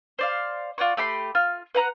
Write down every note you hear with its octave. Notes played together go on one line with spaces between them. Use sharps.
C5 D5 F5
F4 D5 F#5 C#6
A3 G4 B5 C6
F4 F6
B4 F#5 A#5 F#6